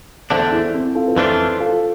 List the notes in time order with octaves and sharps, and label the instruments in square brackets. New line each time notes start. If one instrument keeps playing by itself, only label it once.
[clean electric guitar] E2 D3 A3 D4 [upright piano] A4 C5
[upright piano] E4 G#4
C4 E4
F4 A4
B4
[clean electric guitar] F2 E3 A3 D4 F4 [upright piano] A4 C5
[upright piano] F4 A4